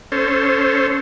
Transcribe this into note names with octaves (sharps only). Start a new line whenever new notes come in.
C#4 A4 C5